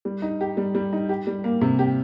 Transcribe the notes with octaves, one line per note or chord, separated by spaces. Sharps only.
G3
D#4
G4
G3
G3
D#4
G4
G3
A#3
C3
G4